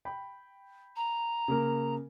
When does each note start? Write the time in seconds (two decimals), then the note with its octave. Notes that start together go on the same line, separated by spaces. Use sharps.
0.05 G5 B5
0.96 A#5
1.48 C#3 A#3 A#4